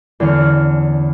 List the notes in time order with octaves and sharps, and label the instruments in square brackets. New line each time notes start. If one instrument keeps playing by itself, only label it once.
[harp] E2 D3 C#4 F6 C#7